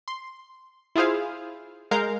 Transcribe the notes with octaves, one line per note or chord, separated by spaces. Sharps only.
C6
E4 F4 G#4 C5 F5
G#3 A#4 F5 A#5 G6